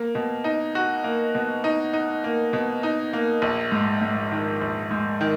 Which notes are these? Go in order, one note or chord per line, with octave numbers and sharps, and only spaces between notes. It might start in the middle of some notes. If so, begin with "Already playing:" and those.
Already playing: A#3
B2
D#4
F#4
A#3
B2
D#4
D#4
A#3
B2
D#4
A#3
A#1
G#2
G#2
D#3
A#1
G#2
D#3